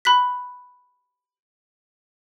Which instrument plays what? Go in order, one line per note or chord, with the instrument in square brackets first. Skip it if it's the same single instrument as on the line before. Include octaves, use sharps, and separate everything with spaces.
[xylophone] B5 F#6 B6